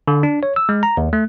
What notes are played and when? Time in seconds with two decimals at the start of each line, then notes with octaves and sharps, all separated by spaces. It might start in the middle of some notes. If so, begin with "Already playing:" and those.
0.08 D3
0.23 D4
0.43 C#5
0.56 E6
0.69 G#3
0.83 A#5
0.97 D#2
1.13 A3